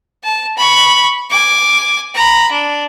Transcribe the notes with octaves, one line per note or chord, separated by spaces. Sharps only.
A5
B5 C#6
G#5 D6
A#5 B5
D4